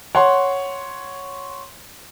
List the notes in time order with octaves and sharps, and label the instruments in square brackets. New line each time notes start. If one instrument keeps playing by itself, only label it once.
[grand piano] C#5 F#5 C6